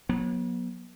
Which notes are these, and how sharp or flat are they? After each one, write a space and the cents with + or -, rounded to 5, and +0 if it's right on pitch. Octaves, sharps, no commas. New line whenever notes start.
F#3 -30 B3 -45